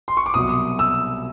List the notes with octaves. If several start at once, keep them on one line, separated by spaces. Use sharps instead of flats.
C6
C#6
D6
C2 B2 F#3 D#6
E6